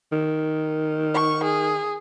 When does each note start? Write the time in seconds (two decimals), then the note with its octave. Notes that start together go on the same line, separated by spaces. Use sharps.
0.12 D#3
1.15 C#6
1.44 G#4